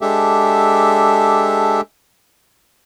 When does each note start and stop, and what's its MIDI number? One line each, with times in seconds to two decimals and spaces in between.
0.01 1.81 56
0.01 1.81 62
0.01 1.81 67
0.01 1.81 69
0.01 1.81 76